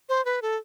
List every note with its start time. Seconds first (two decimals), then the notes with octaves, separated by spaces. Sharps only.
0.09 C5
0.25 B4
0.42 A4